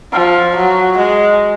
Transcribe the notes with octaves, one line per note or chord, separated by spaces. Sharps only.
F3
F#3
G#3